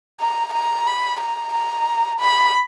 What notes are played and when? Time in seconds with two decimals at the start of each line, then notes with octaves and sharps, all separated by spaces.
0.20 A#5
0.54 A#5
0.87 B5
1.20 A#5
1.53 A#5
2.20 B5